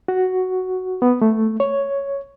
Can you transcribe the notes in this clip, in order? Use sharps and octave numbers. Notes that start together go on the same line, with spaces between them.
F#4
B3
A3
C#5